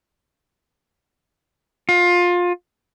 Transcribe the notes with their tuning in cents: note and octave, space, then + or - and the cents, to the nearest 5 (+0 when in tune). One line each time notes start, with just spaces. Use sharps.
F4 +20